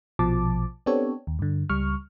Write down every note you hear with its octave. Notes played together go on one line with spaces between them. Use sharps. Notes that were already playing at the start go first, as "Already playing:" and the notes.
A#1 B2 F3 A5 D6
B3 C4 D4 G4 A4 C#5
D#2
G2 D3
C#2 G3 C#6 F6